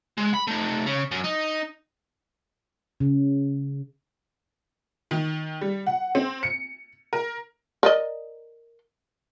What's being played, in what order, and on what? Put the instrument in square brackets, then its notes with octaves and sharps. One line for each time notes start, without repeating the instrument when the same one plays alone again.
[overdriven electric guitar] G#3
B5
A3 D#4
C#3
F#2
D#4
[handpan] C#3
[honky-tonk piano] D#3
G3
F#5
C4
C#7
A#4
[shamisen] A#4 D5 D#5